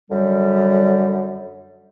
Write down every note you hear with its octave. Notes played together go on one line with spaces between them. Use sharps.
F#2 D3 F#3 G3